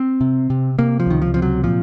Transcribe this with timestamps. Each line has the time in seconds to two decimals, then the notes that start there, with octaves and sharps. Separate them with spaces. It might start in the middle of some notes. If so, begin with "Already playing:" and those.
Already playing: C4
0.21 C3
0.50 C3
0.79 C3 A#3
1.00 F3
1.06 C#2 D#3
1.22 F3
1.34 C3 F3
1.42 F#3
1.64 A#2 F3